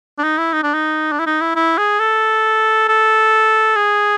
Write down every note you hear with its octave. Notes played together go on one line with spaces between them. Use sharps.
D4
D#4
E4
D#4
D4
D#4
D4
E4
D#4
E4
E4
G#4
A4
A4
G#4